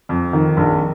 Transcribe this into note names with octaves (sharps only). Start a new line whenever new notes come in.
F2
D#3
A#1